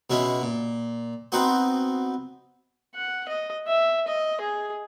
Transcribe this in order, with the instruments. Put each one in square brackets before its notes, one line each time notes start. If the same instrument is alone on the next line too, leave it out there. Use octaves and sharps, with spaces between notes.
[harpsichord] B2 G#3 C#4 E4
A#2
B3 C4 D#4 F#4 C5
[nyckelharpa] F#5
D#5
E5
D#5
G#4